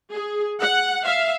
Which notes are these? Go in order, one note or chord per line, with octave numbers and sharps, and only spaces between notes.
G#4
F#5
E5 F5